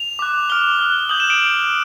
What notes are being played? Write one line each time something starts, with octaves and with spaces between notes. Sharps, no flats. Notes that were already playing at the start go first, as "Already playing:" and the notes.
Already playing: F7
D6 F#6
D6 F6 G7
D#6 F#6
D#6 G6 F#7
E7
D7